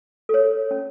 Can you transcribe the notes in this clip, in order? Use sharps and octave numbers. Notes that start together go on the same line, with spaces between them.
A4 C#5
C#4